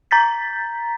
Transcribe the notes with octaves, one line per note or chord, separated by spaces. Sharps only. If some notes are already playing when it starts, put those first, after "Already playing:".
A#5 G6 A6 B6